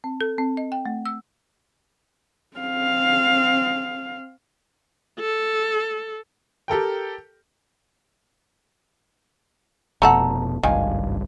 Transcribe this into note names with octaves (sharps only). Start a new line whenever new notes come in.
C4
A4
C4
D#5
G5
A3
E6
C4 F5
A4
G4 A4 A#4 G5
F1 B2 A3 A4 F#5 A#5
G#1 C#2 G2 D#3 F5 G#5